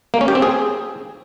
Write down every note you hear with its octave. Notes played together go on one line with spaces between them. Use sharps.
A#3
C#4
G4
C4
G#4